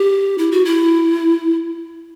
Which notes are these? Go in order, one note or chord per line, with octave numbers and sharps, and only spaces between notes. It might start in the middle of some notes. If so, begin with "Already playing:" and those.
Already playing: G4
E4
F#4
E4